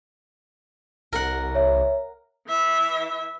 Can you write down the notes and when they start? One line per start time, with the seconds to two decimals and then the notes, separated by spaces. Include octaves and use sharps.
1.13 C2 A#4 F#5
1.55 C#5 E5
2.48 E3 E5